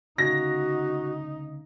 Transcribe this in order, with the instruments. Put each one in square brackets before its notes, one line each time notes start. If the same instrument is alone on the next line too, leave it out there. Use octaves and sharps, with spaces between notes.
[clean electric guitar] D2 C#3 [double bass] D#4 [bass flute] F#4 [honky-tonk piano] A#6